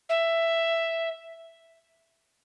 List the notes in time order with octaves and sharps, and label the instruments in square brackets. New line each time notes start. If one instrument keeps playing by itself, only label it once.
[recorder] E5